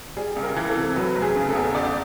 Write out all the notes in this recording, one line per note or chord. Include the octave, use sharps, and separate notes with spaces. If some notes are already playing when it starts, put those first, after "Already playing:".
G3 G#4
C#2
A#4
E3
A4
C3
F#3 B4
F1
G#4
C#3
A4
E2
G#1 D5